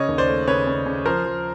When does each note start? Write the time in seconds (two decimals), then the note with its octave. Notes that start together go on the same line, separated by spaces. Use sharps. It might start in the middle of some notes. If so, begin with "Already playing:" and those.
Already playing: C#3 C#5 D#5
0.08 D#2
0.18 C5 D5
0.28 A3
0.47 C#3 B4 C#5
0.67 C#3
0.86 C#3
1.05 F3 A#4 C5
1.25 F3